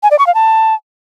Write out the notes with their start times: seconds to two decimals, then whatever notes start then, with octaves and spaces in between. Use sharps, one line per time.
0.03 G#5
0.11 D5
0.19 C#6
0.27 F5
0.35 A5